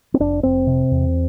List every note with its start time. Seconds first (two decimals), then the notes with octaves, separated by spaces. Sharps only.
0.14 C4
0.20 F1 D4
0.43 F1 C4
0.67 C3
0.91 E2